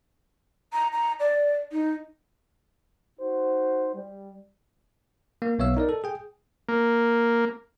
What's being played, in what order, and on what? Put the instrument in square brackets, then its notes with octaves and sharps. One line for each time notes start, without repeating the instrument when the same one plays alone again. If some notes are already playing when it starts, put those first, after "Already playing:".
[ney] A#5
A#5
D5
D#4
[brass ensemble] D#4 F#4 C5
G3
[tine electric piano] A#3
B1 B3 C#5 E5 F5 E6
D#4 A#4 D5
A4
G#4 G5
[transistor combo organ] A#3